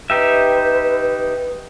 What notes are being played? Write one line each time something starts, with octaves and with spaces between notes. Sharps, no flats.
D#4 G4 B4 E5